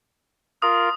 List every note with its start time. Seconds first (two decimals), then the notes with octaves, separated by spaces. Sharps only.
0.62 F4 A#4 D#6